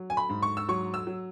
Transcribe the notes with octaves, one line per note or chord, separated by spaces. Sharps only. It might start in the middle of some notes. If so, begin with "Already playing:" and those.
Already playing: F#3
G#5
B5
G#2
C#6
E6
F#3 C#6
E6
F#3